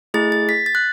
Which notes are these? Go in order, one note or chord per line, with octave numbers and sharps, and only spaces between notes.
A3 E4 G#4 A6
A6
B6
A6
F#6